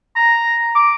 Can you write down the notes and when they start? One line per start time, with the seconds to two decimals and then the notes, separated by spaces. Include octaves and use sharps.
0.16 A#5
0.75 D6